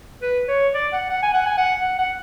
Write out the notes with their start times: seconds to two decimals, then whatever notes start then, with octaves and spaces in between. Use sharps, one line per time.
0.22 B4
0.48 C#5
0.74 D5
0.93 F#5
1.10 F#5
1.22 G#5
1.34 F#5
1.46 G#5
1.58 F#5
1.81 F#5
1.99 F#5